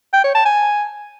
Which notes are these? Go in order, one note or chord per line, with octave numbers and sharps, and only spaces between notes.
G5
C#5
A5
G#5